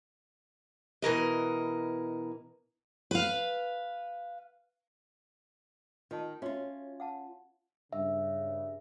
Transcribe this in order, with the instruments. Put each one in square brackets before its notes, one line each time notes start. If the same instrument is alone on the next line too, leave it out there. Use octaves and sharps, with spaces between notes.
[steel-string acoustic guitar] B2 E3 A#4 D#5
B4 F5
[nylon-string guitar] D#3 [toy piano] F4 D#5 A5
[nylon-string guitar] C#4 F4 [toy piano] F#4 E5 C6
[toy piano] F5 F#5 A5
[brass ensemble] G2 C#3 [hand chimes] E5